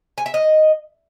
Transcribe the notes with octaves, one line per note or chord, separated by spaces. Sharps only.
G#5
E5
D#5